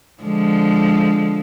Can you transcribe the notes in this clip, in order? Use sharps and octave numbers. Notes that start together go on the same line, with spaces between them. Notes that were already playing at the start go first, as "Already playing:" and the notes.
D3 F3 G#3